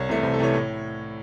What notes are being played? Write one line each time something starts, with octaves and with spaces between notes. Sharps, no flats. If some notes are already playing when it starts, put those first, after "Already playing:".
Already playing: C2 C#5
C3 E3 A3
C2 C5
A4
C3 E3 A3 C#5
A2